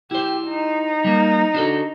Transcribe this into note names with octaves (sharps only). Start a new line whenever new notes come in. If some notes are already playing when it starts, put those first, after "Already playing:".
E4 G4 C5
D#4
G3 A#3
D4 F#4 A4